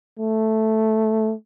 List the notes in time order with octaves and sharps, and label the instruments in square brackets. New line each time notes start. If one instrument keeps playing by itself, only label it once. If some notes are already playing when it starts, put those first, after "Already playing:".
[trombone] A3